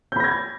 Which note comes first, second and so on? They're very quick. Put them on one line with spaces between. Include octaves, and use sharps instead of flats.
G6 B5 A#6 G#6